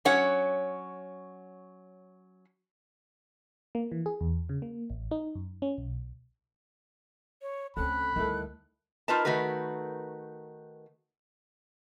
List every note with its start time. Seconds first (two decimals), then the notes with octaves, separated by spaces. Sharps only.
0.05 F#3 C#4 C#5 F#5
3.75 A#3
3.92 E3
4.06 G#4
4.21 E2
4.49 C#3
4.62 A#3
4.90 A1
5.11 D#4
5.35 F#2
5.62 C#4
5.78 B1
7.42 C#5
7.77 D2 C#3 C4 C#4 A4 B5 F#6
8.16 D2 D#3 G3 E4 A4
9.08 D#4 F4 A#4 B4 D#5 A5
9.25 D#3 A3 F#4 A#4 B4